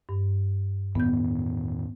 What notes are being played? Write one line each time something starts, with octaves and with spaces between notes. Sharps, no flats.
G2
E2 A2 D#3 B3 G6